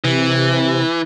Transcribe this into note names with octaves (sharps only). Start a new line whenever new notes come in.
C3 E3